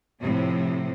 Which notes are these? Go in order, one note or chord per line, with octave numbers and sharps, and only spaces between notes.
A2 C3 F3